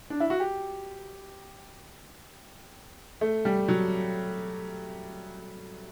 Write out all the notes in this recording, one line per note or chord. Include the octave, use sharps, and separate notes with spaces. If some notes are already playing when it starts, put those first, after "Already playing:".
D4
E4
F#4
G4
A3
G3
F#3